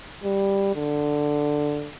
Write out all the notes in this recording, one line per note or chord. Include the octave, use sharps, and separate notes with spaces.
G3
D3